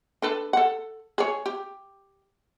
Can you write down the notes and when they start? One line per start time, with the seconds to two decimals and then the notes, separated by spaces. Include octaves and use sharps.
0.22 D4 A4 B4
0.53 A4 F#5
1.18 G#4 C#5
1.46 G4